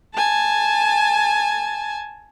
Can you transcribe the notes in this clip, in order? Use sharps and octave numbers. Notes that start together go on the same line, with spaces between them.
G#5 A5